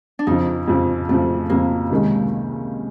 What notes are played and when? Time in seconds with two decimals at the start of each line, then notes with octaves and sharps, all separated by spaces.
0.19 D4
0.27 F2 C#3 F3 D#4
0.68 F2 C#3 F3
1.09 F2 C#3 F3 A3
1.49 F2 C#3 F3 A#3
1.90 C#2 C3 D#3 G#3 C#4